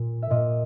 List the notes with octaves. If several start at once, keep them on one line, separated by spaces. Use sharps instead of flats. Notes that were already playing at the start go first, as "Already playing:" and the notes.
Already playing: A#2
E5
A#2 D#5